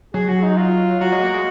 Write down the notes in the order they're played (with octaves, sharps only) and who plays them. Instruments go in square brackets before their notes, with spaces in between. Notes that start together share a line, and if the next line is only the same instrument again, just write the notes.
[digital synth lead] F#3 [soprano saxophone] G#4
[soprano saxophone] F#4
D#4
F4
[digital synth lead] F#3 [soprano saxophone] F#4
[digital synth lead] G#3
A#3
G#3